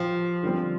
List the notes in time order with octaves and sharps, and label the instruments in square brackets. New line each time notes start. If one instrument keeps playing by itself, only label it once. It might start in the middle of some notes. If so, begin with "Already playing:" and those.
Already playing: [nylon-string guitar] F3 [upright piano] G4
[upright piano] D3 G3 C4